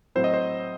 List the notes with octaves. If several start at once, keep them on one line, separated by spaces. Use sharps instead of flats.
A2 F#3 C4 E4 C5
D#5
C5